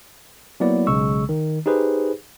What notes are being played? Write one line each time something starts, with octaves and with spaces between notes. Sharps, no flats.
F#3 A#3 B3 E4 D5
B1 C#3 G#3 C#6 E6
D#3
D#4 G4 G#4 B4 C5